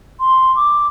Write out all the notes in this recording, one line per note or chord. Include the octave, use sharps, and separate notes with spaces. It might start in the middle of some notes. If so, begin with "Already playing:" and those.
C6
D6